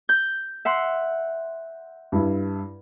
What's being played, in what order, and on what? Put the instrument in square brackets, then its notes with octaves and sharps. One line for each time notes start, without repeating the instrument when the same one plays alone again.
[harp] G6
E5 F#5 C6
[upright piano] G2 E4